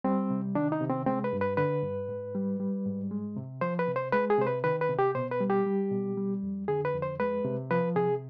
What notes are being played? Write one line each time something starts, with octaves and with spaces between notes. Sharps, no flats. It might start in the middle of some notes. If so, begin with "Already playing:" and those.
G3 C4
C3
D#3 D4
D#4
C3
C4
G#3 C4
B4
G2
B4
D3 B4
G2
G#2
G3
G3
G#2
G#3
C3
F3 C5
B4
C3
C5
G#3 B4
G#4
C3 C5
B4
D#3 B4
B4
C3
G4
B2 C5
B4
G3
G4
G3
B2
G3
F2
D3 G#4
B4
F2
C5
G#3 B4
C3
F3 B4
C3 G#4